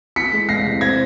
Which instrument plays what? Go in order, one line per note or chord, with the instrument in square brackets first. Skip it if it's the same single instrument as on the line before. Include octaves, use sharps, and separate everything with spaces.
[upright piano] E3 B6 C#7
G#3
E2 A#6 C7
C3
C4 G#6 A#6